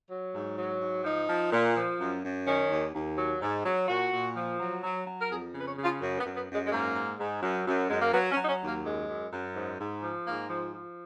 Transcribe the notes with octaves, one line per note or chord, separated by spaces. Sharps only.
F#3
G#2
F#3
G#2
F3 D#4
F3
A#2
F3
F#2
F#2
D#3 C#4
D#2
D#2
F#3
G#2
F#3
A#2 F#4
A#2
F3
F#3
F#3
F#3
A#4
F2 G#4
C#3
B4
C#5
C#3
F4
F#2
B3
F#2
B3
F#2
G#3
G#3
G#2 A#3
G#2
G#2
F#2
F#2
F#2 G#3
A#3
F#3 B3
C#4
F#3
D#4
C#4
D#2
A#3
F#2 G#3
F#2
F#2
G#2
G#2
F3
G#2 A#3
F3
F3